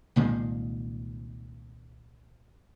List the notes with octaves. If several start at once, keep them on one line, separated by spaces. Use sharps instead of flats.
C2 A#2 D#3 G#3